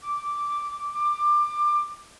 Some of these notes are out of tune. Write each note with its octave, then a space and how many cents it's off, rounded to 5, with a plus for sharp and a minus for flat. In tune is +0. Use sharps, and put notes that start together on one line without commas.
D6 -5
D6 +25